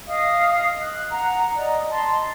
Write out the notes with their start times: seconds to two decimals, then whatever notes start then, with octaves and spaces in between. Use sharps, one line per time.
0.06 D#5 F5 D#6
0.81 F#6
1.11 F#5 A#5
1.56 D5 D#5
1.90 A5 A#5 C6